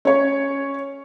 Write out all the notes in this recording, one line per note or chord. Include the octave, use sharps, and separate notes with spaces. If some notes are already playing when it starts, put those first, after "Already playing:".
C#4 C#5